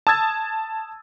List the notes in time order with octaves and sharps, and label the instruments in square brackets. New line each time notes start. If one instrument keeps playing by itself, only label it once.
[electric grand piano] A5 D#6 E6 G#6 A6